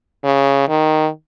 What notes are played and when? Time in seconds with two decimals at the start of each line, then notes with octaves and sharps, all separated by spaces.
0.24 C#3
0.68 D#3